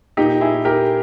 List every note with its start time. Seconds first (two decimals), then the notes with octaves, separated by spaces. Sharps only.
0.17 A#2 D#4 G4
0.41 E4 G#4
0.53 A#2
0.65 G4 A#4